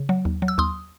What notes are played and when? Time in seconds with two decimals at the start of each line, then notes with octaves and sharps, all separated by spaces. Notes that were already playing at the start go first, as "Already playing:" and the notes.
Already playing: C#3
0.09 F#3
0.25 D#2
0.42 F#3
0.48 E6
0.58 D#2 C6 D#6